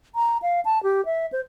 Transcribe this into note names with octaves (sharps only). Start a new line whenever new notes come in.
A#5
F5
A5
G4
E5
C5